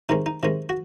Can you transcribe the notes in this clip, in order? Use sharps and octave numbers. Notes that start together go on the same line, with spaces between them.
C3 D#3 G#3 C#4 D#4
D#4
C3 D#3 G#3 C#4
F#4